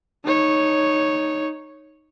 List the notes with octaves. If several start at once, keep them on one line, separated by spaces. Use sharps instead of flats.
D#4 C#5